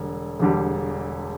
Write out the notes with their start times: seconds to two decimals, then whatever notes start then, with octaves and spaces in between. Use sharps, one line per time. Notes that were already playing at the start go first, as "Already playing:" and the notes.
Already playing: E1 D3 G3
0.39 E1 E2 D3 G3